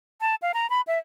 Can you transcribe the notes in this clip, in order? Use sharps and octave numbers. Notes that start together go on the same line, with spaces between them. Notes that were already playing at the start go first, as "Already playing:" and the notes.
A5
F5
A#5
B5
E5